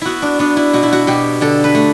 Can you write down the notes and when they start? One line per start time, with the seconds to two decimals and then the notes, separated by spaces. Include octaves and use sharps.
0.01 B3 E4 F#4
0.22 D4
0.39 B3 D4
0.57 E4
0.73 B2 F#4
0.83 E4
0.92 F#4
1.07 B2 G4
1.41 D3 A4
1.64 B4
1.75 A3